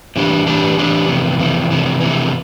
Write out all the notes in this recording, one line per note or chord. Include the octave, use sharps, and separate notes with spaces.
A2 E3 G3 D4 G4
A2 E3 G3 D4 G4
A2 E3 G3 D4 G4
F2 C3 E3
F2 C3 E3
F2 C3 E3
F2 C3 E3